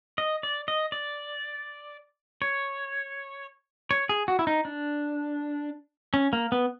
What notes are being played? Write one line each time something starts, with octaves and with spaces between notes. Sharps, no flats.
D#5
D5
D#5
D5
C#5
C#5
G#4
F#4
E4
D#4
D4
C#4
A#3
B3